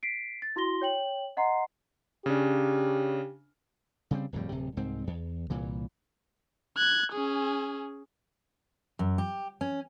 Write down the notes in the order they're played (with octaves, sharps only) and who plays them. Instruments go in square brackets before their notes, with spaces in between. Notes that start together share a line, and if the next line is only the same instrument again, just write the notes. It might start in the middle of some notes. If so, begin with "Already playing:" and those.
[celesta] B6 C7 D7
A6
E4 F#4 C6 A#6 G7
C#5 G5 F#7
D#5 F#5 A#5 C6 C7
[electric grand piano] C#3 C#4 D4 [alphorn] G4
[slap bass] C#3 G3 C4
D1 F2 A2 G3
D1 C3
C2 G#2 C4
E2
C2 A#2 E3
[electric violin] F#6 G#6
C#4 G#4
[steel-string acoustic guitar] F#2
G4
C#4